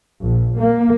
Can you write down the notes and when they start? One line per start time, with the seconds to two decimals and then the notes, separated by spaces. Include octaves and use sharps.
0.22 A#1
0.60 A#3